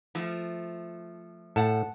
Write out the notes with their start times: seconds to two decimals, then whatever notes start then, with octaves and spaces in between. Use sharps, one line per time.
0.15 F3 A3
1.56 A2 F#5 A5